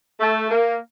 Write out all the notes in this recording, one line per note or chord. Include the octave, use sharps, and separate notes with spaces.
A3
A#3